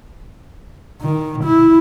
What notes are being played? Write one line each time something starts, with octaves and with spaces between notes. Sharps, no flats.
D#3
E4